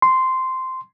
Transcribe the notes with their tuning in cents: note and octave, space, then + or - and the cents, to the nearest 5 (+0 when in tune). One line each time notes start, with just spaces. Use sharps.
C6 -10